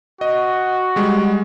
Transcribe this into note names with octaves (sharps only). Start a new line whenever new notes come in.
F#4 D#5
G3 G#3